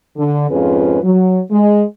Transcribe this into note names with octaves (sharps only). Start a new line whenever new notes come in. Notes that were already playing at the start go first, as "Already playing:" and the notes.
D3
F2 G#2 C#4 F4 G#4 B4
F#3
G#3